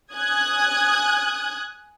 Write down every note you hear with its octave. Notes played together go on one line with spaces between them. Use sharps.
G#5 D#6 F#6 G#6